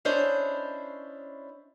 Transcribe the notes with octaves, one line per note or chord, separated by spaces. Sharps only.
C#4 D4 E4 C5 C#5 D#5